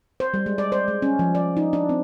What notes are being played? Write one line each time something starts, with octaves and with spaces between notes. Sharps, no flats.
C5
G3
G#3
D5
C5
G#3
C#4
F3
D5
D#4
D4
C4